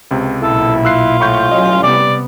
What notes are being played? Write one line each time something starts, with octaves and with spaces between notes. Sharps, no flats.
C#2 C3
B1 A#2 E4 A4
F4 E6 F#6 C7
A2 B5 C#6 G6
A1 F#3 C#4 D#5
C3 G3 B3 D5